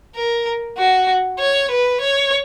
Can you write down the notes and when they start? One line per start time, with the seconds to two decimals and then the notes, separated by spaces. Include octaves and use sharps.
0.15 A#4
0.77 F#4
1.39 C#5
1.70 B4
2.00 C#5